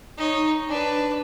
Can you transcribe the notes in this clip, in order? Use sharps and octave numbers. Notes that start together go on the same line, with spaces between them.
D#4 C#5
D4 B4